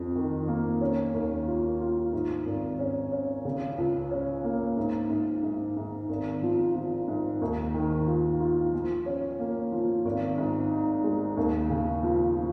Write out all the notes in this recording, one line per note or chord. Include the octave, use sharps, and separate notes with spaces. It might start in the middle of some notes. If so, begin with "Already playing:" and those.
Already playing: F2
D#3
A#3
C#4
D#2
F4
F4
G#2
G#1
C#4
C#4
C#3
C#2
C#4
A#3
G#2
G#2
G#2
G#2
G#1
F3
F3
G#2
D#2
D#3
F4
F4
F3
C#4
A#3
F3
G#1
G#2
D#4
G#3
D#2
C#3
F3
F3